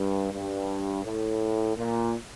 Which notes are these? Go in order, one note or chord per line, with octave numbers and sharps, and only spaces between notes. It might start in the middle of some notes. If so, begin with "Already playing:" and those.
Already playing: G2
G2
A2
A#2